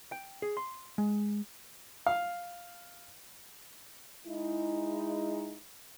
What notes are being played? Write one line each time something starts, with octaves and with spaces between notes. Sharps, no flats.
G5
G#4
C6
G#3
F5
G#3 D#4 E4